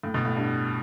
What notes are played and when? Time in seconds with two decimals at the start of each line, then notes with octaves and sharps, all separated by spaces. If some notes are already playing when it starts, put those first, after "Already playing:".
0.03 A2
0.14 B2
0.25 A2
0.36 G2